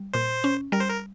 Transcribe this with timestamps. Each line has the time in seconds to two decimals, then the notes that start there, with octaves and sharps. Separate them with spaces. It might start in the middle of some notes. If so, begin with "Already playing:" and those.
Already playing: G3
0.13 A#2 C5
0.44 C#4
0.72 G3 A#4
0.80 C5
0.89 A#4